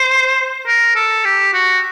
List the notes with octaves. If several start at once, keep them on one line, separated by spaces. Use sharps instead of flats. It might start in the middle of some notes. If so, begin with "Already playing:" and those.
Already playing: C5
A#4
A4
G4
F#4